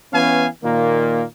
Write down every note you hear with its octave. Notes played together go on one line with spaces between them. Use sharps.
E3 B3 C#4 F5 G#5
A#2 D#3 A#3